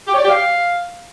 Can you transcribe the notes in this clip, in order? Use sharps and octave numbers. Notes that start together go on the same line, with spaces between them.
G4
C#5
D5
G4
F5